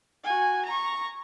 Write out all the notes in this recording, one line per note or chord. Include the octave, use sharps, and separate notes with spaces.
F#4 G#5
A#5 C#6